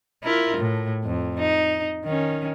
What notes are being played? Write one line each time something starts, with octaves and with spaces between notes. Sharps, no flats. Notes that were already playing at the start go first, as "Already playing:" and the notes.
E4 F4 A#4
A2
F2
D#4
D#3 C#4